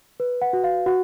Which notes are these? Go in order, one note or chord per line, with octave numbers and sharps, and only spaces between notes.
B4
F#5
F#4
F5
F#4 F#5